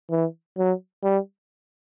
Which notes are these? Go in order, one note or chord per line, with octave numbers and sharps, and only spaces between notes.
E3
F#3
G3